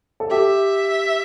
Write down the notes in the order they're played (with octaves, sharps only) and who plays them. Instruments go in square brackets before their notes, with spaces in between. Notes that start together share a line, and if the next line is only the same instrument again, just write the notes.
[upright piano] A4
[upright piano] G4 [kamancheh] E5